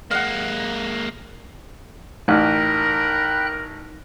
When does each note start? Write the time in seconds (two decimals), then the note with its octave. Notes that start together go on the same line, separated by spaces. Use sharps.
0.11 G#3 A#3 F5 F#5
2.28 A1 D#4 A#4 G5 B5 F#6